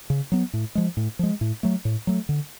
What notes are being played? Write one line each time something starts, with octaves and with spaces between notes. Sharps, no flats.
C#3
F#3 B3
A2
F3 G#3
A2
F3 G#3
A2
F#3 A3
A2
F#3 A3
D3